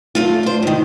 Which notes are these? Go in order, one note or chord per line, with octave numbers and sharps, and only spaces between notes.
F#2 A3 F4
D4 C5
G#2 D#3